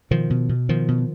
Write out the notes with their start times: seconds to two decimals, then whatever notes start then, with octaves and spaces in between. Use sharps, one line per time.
0.11 B2 D#3 F3
0.30 B2
0.49 B2
0.69 B2 D#3 F3
0.88 B2